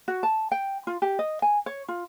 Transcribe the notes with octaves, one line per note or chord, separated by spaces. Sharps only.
F#4
A5
G5
F4
G4
D#5
G#5
C#5
F4